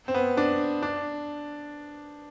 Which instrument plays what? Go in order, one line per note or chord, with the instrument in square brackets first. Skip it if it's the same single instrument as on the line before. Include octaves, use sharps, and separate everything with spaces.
[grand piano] C4
B3
D4
D4